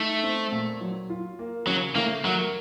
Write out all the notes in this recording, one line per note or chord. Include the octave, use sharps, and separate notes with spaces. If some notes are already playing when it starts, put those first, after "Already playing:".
Already playing: A3 D#4
C4
A#2
F#3
F4
A#3
C#3 F#3
A3 A#3
F#3 A#4